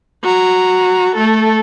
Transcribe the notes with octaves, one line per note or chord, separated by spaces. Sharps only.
F#4 A#5
A3 A4